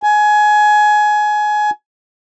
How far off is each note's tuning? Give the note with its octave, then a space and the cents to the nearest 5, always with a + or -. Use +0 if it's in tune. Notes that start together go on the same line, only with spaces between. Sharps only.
G#5 +20